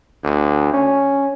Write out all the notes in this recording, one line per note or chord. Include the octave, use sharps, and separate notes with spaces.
D2
C#4